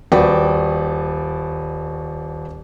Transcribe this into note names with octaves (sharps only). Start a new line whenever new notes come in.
D#1 F#4 B4 D5 G5